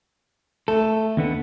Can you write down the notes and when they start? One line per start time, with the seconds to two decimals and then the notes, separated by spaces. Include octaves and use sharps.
0.68 A3 A4
1.17 D#2 D3 B3